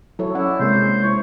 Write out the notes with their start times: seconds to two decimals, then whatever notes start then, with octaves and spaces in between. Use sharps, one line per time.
0.19 F#3 E4 A4 C#5
0.35 C#4 E4 C#5 D5 F#5
0.59 C3 G#3 A#3 C5
1.03 G#3 E4 C5 C#5